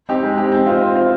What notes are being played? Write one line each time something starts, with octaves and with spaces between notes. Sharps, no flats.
C4 D#4 G4
G#3
C4 D#4 G4
C4
F4 C5 D#5
C4
F4 C5 D#5